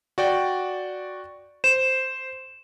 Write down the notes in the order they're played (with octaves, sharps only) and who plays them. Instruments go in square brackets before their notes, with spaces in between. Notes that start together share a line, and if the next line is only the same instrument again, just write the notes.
[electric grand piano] F#4 D5 G5
[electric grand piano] C5 [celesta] E7